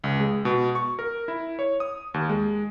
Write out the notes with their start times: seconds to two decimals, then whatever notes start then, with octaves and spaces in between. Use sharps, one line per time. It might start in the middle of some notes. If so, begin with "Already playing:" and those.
0.04 C#2
0.20 G#3
0.45 B2
0.75 C#6
0.99 A#4
1.28 E4
1.59 C#5
1.80 D#6
2.14 D#2
2.29 G#3